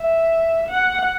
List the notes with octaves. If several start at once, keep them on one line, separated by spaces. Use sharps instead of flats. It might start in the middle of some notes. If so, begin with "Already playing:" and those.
Already playing: E5
F#5